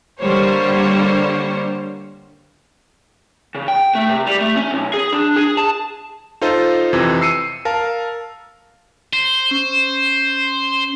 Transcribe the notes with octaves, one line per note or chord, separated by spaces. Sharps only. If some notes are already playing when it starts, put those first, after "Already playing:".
D3 G3 A#3 C5 C#5
C#3
G5
A3
C3
G3
A3
C#4
B1
G#4
D4
G#4
A5
D#4 F4 A4 C5 D#5
F2 C3 E3
E6 C7 C#7 D#7
A#4 F5 A5
C5
C#4